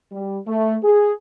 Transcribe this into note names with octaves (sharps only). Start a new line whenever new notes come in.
G3
A3
G#4